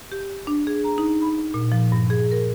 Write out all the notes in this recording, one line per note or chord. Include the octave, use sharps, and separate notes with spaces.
G4
D4
G#4
A#5
D#4
B5
A#2
F3
G2
G#4
A#4